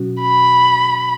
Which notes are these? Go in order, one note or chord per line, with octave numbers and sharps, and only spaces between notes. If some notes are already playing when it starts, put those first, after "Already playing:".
Already playing: B2 F#3 C#4 F#4
B5